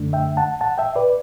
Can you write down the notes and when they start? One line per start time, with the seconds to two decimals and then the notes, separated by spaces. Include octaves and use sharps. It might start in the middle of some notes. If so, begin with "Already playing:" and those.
Already playing: F#2 D3 A3 D4
0.13 E5 G5
0.37 F#5 A5
0.61 F#5 A5
0.78 E5 G5
0.96 B4 D5